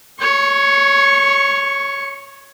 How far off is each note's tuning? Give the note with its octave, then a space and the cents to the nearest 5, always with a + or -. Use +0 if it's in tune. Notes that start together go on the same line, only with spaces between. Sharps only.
C#5 +5 C#6 -30